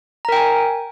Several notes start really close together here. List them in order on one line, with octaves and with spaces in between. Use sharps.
A#5 A#4 G5 G#5